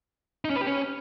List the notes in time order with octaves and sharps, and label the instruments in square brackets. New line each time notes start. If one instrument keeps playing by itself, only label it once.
[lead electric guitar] D#4
C#4
B4
G4
C#4